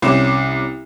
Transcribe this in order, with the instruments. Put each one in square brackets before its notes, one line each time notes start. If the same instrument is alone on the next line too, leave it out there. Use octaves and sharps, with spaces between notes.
[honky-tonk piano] C2 C#4 D6 E7